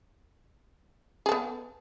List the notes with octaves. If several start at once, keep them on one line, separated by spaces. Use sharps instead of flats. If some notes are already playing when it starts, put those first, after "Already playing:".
B3 G#4 A4